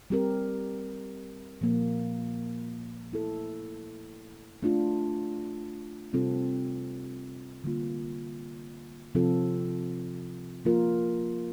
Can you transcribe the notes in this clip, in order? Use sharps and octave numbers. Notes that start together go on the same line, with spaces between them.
G3 C4 G4 A#4
A#2 F3 A#3
A3 E4 A4
A3 D4 F4
C3 G3 C4 F4 A4
D3 G3 A#3 F4
C3 F3 C4 F4 A4
F3 A#3 F4 A#4